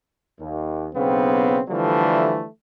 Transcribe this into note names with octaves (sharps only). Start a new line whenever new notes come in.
D#2
B1 C#3 B3 C4
D3 E3 F3 G3 A3